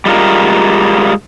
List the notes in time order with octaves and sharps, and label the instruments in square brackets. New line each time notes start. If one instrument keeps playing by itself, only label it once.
[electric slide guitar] G3 G#3 F4 A#4